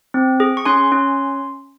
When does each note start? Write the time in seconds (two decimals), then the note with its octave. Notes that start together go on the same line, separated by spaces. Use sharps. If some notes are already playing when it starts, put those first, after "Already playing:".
0.14 C4
0.40 G#4
0.57 C#6
0.65 C#4 G#5 C6
0.92 C#4